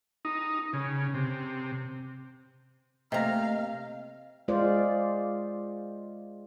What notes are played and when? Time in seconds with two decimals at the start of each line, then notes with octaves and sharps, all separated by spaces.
0.25 D#4
0.73 C#3
1.14 C3
3.12 C3 A3 A#3 D#5 F5 A#5
4.48 G#3 F4 C5 D5